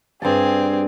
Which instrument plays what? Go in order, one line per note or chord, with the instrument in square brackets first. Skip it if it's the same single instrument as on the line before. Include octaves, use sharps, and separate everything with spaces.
[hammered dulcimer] G2 A5 [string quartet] C4 G#4